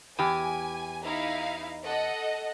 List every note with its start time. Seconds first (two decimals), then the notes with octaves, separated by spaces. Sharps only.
0.19 E2 G4 G#5
1.04 D#4 E4 F5
1.85 A4 D#5 F#5